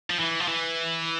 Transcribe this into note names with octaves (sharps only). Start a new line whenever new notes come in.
F3
E3
F3
E3